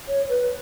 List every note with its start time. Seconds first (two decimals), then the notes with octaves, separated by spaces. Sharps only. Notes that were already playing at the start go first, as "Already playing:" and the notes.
0.08 C#5
0.29 B4